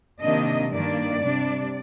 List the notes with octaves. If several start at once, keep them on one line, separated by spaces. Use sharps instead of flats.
C3 D#3 A#3 D4 D#5
G2 D#3 A#3 D4 D5
C3 G3 D4